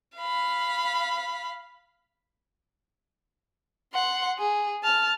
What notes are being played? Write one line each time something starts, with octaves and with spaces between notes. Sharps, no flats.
F5 B5
F#5 C6
G#4
A5 F6